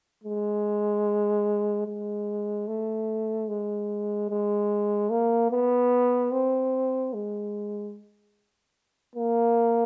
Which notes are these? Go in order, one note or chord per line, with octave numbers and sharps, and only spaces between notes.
G#3
G#3
A3
G#3
G#3
A#3
B3
C4
G#3
A#3